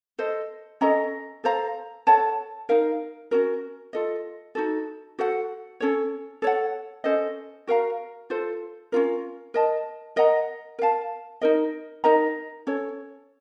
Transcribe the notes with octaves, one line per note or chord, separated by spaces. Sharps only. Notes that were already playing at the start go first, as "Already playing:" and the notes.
A4 C5 D#5
C#4 A4 D#5 A#5
A4 C5 F5 A#5
A4 C#5 F#5 A5
D#4 A#4 F5
C#4 F#4 A#4
F4 A4 D#5
D#4 F#4 A4
F#4 A4 C5 F#5
C#4 A4 C#5
A4 C#5 F#5
C#4 A4 C5 D#5
F#4 A#4 F5 A#5
F4 A4 C5
C#4 F4 A#4
A#4 D#5 A5
A#4 D#5 F#5 A#5
A#4 F5 A5
D#4 A#4 D#5
D#4 A#4 D#5 A#5
C#4 A4 C#5